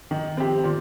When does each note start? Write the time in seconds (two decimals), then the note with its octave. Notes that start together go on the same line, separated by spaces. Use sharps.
0.11 D#3
0.37 C4 G4
0.64 A#2 D#3